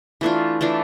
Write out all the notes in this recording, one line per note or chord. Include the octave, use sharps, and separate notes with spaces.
E3 A3 D4 F4
E3 A3 D4 F4